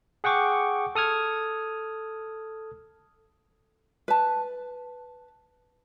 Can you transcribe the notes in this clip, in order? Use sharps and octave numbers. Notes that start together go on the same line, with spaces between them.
G#4 F#5 G5 C#6 D6
A4 D#6 F6 G#6
B4 A5